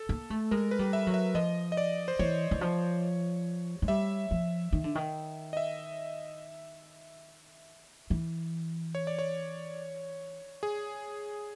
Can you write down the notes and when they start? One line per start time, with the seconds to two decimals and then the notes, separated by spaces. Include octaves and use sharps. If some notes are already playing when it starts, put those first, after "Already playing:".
Already playing: A4
0.09 A#3
0.30 A3
0.51 G#3 A#4
0.71 B4
0.79 G3
0.93 E5
1.07 F#3
1.14 E5
1.35 F3 D#5
1.72 D#5
1.77 D5
2.08 C5
2.19 E3 C#5
2.51 E3
2.61 F3
3.82 G#3
3.88 G3 E5
4.31 F3
4.72 D#3
4.84 D3
4.95 D#3
5.53 D#5
5.57 E5
8.10 E3
8.95 C#5
9.07 D5
9.19 C#5
10.63 G#4